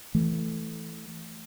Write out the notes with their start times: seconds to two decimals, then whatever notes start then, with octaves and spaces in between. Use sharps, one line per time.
0.15 E3 A3